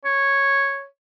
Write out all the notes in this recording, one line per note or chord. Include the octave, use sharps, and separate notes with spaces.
C#5